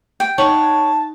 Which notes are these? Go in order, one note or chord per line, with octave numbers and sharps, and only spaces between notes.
G5
D#4 C#5 F#5 A5